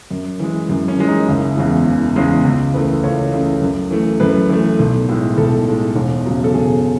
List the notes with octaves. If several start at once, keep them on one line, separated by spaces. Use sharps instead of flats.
F#2
E3 G#3
F#2
C#4
E3 G#3
D#4
F#1
E2 C#3 G#3
F#1
E2 C#3 G#3
C#2
C#3 E3 A3 B4
C#2 C#5
C#3 E3 A3
F#2
E3 A3
F#2 B4
E3 A3
B1
A2 G#3
B1 A4
A2 G#3
E1
E2 C#3 F#3
A4
E1 G#4